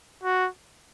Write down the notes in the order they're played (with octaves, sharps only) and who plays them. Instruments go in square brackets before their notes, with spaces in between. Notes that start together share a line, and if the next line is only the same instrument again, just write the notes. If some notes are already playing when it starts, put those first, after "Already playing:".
[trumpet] F#4